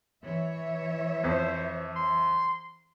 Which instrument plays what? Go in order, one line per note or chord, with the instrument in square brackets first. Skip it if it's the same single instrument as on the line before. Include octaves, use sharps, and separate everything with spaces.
[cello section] E3 C#5 E5
[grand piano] F2 [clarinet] C5
[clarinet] C6